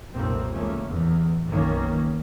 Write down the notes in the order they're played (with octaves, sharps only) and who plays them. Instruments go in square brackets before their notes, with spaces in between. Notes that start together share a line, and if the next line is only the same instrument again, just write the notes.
[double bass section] F1 B1 A#2 A3 A#3 C4
C#2 E3 A3 A#3 C#4
E2 A2
F#1 B1 D#3 A#3 C#4